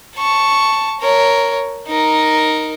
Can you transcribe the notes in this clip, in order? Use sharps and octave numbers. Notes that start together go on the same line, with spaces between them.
A5 C#6
A#4 C#5
D#4 A#4